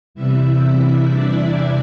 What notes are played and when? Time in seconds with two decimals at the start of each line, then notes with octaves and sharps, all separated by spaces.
0.14 E2 C3 E3 G3 E4 E5
0.79 E4 E5
1.11 D4 D5
1.42 D4 D5